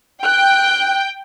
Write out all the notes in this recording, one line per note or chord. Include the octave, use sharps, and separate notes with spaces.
G5 F#6